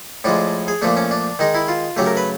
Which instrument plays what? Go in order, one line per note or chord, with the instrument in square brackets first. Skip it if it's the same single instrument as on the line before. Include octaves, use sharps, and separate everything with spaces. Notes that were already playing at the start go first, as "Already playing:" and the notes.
[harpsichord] A2 F3 G#3 D4
G#4
A#2 F3 A3 D4
C#4
D4
D#3 G#3 D#4
E4
F4
C#3 F#3 A3 G4
A#4
B4